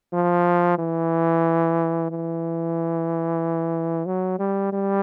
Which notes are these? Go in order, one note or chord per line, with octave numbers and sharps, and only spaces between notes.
F3
E3
E3
F#3
G3
G3